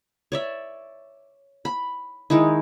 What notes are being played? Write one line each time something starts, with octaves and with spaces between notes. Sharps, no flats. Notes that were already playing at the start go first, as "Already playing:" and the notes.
C#5 D5 E5
B5
D#3 G#3 D#4 E4